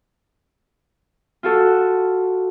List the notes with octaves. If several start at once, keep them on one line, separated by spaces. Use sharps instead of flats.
F4 F#4 A4